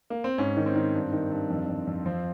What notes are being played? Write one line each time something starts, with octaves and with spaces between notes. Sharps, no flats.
A#3
C4
G#2 C#4
D#3
C4
D#3
G2
D#3
G2
F2
F2
F2
F3 C4